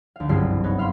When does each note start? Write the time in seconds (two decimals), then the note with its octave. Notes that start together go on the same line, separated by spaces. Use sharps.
0.16 D2 F5
0.29 F#1 C2 G2 F4 G#4 C7
0.50 E3
0.64 B3 C#4 D#4
0.78 E5 F5 B5 C6 F6